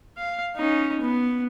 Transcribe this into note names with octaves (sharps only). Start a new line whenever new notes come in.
F5
C#4 D#4
B3